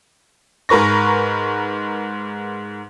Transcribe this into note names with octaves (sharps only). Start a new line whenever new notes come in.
G#2 A#4 B4 C#6 A#6